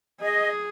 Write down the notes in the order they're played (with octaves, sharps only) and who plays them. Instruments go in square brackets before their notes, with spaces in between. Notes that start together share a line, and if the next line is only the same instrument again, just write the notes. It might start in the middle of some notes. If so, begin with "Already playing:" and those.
[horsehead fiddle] G#4 [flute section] D#5